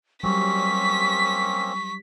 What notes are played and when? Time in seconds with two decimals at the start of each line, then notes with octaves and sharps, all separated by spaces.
0.23 F#3 G3 A#3 C4 C#4 C#6 B6